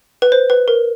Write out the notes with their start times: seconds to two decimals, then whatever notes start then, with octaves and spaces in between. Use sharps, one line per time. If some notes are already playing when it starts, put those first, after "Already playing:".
0.22 B4
0.32 C5
0.50 B4
0.68 A#4